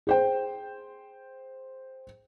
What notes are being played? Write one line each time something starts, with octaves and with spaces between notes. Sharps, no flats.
G#4 C5 G5